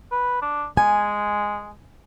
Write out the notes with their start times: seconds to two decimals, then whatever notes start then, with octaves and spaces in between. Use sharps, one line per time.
0.12 B4
0.42 D4
0.77 G#3 G#5